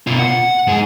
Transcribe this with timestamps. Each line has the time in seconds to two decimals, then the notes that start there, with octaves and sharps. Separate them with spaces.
0.07 B2 F4
0.19 F#5
0.67 G#2 G#4